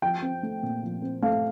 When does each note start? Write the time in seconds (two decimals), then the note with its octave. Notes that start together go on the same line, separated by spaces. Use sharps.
0.02 F3 G5
0.22 C4
0.43 A3
0.63 A#2
0.83 F3
1.02 C4
1.22 A3 F5